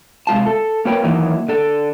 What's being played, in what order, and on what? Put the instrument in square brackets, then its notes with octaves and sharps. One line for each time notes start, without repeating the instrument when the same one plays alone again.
[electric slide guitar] C3 G#3 F4 A5
A4
A#3 F#4 A#4 B4 C#5 G5
D#3 E3 F#3 A#3 D#4 E4
D3 A4